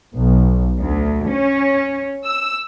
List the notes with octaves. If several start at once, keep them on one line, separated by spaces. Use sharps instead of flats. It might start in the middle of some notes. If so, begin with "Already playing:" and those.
B1
D2
C#4
E6